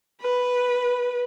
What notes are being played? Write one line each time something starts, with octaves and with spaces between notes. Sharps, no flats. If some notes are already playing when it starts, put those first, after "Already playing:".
B4